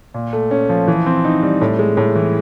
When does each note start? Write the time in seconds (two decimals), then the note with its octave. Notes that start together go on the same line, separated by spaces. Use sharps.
0.14 A#2
0.33 A3
0.51 C#4
0.69 F3
0.88 E3
1.06 C4
1.25 D#4
1.43 G3
1.61 A2
1.79 G#3
1.97 A2
2.16 E3